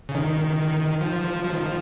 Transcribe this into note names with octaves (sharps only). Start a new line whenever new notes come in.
C#3
D#3
F3
F3
D#3
F3